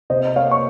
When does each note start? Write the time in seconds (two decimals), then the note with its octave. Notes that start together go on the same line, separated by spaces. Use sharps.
0.10 C3 C5 D#5
0.36 A#3 C#5 F5
0.51 C#6